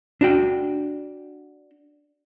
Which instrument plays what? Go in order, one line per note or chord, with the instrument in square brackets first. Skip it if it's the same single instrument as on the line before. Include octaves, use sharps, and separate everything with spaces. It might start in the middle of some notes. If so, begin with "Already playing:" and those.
[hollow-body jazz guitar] D4 F#4 G5